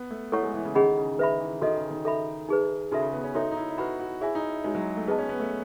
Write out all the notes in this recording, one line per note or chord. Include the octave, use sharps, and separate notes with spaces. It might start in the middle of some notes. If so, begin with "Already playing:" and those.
Already playing: B3
A3
A3 E4 A4 C#5 F#5 C#6
G#3
E3
C#3
D#3 C#4 G#4 D#5 F#5 B5
C#3
D#3 B4 E5 B5
E3
D#3 F#4 A4 D#5
C#3
D#3
A4 E5 B5
D#4 G#4 B4
C#3 D#4 F#4 A4 E5
C#3
B3
C#4
D#4 F#4 A4 C#5 E5
D#4
E4
E4
F#4 B4 F#5 B5
F#4
E4 G#4 C#5 E5 G#5
D#4
G#3 D#4 F#4 C#5
F#3
A3
B3 G#4 B4 D#5 A5
C#4
B3
A3